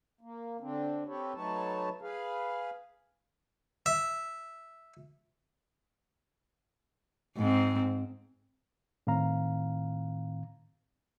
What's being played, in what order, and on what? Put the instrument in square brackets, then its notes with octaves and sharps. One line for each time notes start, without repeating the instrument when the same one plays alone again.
[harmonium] A#3
D3 C4 D4
C4 G4 A4 B4 C#5
F#3 A3 D#4 B4 C#5 A5
G#4 B4 F5
[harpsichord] E5
[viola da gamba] G#2 C4
[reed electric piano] A2 D#3 C4 F5 A#5